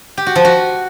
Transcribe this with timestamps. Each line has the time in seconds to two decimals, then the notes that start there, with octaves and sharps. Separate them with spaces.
0.17 G4
0.27 F#4
0.36 F3
0.45 F#4